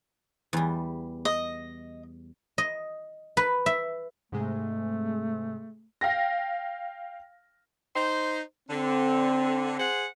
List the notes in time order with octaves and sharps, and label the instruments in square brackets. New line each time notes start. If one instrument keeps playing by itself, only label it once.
[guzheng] E2 G3
[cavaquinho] D#5
[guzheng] D#5
B4
E5
[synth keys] G#2 C3 G#3 [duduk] A3
[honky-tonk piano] F5 G5 A#6
[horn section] D#4 C5
[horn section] D3 [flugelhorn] C4
[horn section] G#4 C5 F#5